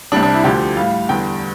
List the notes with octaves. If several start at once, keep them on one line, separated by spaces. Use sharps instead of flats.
C2 C3 G3 D4
D4
E4
D2 D3 F3 G4
A2 G3 F5
E2 D3 G3 G5